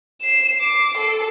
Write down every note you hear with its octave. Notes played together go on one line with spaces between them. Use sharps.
C7 E7
D6 C7
A4